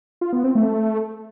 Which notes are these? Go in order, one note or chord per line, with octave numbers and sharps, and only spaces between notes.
F4
B3
C4
A3